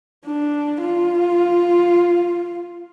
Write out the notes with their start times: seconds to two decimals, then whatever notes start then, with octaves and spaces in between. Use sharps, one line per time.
0.26 D4
0.81 F4